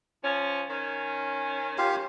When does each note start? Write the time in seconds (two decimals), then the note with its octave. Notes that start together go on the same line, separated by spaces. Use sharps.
0.24 F3 C#4
0.70 D#3 C#4
1.78 F4 G4 F5